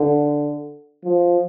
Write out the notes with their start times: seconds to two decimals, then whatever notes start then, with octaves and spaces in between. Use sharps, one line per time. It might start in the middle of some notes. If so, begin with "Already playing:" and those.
Already playing: D3
1.04 F3